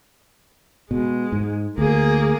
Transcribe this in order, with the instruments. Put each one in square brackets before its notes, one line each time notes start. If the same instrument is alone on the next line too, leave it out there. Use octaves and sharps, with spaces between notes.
[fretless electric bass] B2 [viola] G#3
[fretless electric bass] G#2
[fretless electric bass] D2 [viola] A#3 G#4